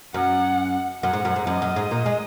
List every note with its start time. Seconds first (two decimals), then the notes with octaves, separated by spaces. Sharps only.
0.14 F#2 F#5
1.03 F#2 F#5
1.13 G#2
1.25 F#2
1.36 G#2
1.47 F#2 D#5
1.62 F#2
1.76 G#2
1.91 A#2
2.06 G#3